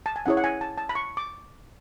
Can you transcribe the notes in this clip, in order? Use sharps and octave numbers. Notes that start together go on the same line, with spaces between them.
A5
G#5
C#4 E4 G#4 C#5 F#5
F#5
G#5
A5
A5
B5
C#6
D6